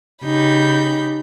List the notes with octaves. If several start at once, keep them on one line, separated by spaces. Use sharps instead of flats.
C#3 D#4 G4 B5 G6